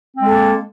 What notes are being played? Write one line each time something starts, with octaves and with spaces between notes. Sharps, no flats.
G#3 A#3 C4 A4